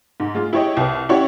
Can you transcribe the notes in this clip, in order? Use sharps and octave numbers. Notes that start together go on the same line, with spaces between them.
G#2
G#3 F4 G#4
E4 G4 C#5 D#5 G5
C2 B4
C#4 E4 F#4 G4 C#5 D5